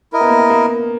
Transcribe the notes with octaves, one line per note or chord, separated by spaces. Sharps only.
E4 A#4 D#5
B3
A#3
B3
A#3